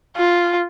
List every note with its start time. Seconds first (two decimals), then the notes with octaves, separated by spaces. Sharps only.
0.17 F4